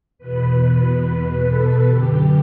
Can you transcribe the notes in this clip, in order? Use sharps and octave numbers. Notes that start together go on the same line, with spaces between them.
E2 B2 B4
A4
F#2 D3 G4